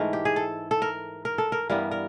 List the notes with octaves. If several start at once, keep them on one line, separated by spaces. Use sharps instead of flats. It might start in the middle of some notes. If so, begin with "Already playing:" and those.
Already playing: G#2 E3 A3 A#4
G4
G#4
A4
A4
A#4
A#4
A4
A#4
G2 E3 G3 B3 A#4
A#4